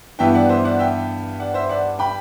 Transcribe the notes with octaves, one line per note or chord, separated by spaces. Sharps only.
G2 E3 B3 E5 G5
D5 F#5
C5 E5
D5 F#5
E5 G5
D5 F#5
C5 E5
D5 F#5
G5 B5